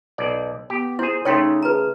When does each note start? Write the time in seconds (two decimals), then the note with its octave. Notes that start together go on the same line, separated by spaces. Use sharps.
0.18 B1 D5
0.70 B3 G4
0.99 E4 G#4 C5
1.25 C#3 A3 D#4 C#5 G5 C6
1.62 G#4 B4 A#5